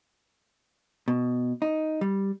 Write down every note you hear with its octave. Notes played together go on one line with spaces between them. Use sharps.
B2
D#4
G3